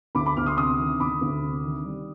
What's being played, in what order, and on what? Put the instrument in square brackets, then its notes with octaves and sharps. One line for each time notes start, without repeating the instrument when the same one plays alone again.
[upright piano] D2 B5 D6
B5 D6
D2 D6 F6
C6 D#6
C3 C6 D#6
D#3
D2 B5 D6
D2
C3
D#3
G3